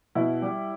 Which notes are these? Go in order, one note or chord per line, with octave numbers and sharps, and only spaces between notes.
B2 E4
G3